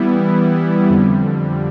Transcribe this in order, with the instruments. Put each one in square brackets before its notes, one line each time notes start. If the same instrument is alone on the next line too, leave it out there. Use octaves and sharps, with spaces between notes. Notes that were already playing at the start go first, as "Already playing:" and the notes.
Already playing: [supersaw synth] E3 G3 B3 E4
F2 D3 G3